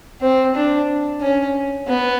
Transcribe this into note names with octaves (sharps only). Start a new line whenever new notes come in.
C4
D4
C#4
B3